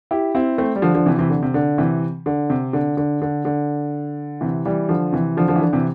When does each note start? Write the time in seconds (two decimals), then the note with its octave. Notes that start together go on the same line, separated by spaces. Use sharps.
0.11 E4 G4
0.35 C4 E4
0.58 A3 C4
0.76 G3
0.82 D3 F3
0.94 D3 F3
1.06 C3 E3
1.19 C3 E3
1.30 D3
1.43 C3
1.54 D3
1.78 C3 E3
2.26 D3
2.50 C3
2.73 D3
2.97 D3
3.22 D3
3.45 D3
4.41 C3 E3
4.65 E3 G3
4.89 D3 F3
5.12 C3 E3
5.37 D3 F3
5.48 D3 F3
5.56 E3
5.61 D3
5.73 C3 E3